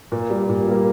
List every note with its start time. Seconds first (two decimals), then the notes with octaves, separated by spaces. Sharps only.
0.12 A#2
0.30 G3 A#3
0.49 A#2
0.67 G3 A#3